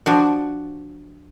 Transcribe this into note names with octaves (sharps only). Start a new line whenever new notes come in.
F3 D4 F#4